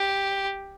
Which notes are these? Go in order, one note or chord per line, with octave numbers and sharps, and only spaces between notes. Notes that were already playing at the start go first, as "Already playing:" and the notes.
Already playing: G4